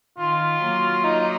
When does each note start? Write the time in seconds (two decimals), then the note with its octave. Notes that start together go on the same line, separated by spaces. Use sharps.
0.18 D#3 F4
0.62 F#3 A#3
1.04 D#4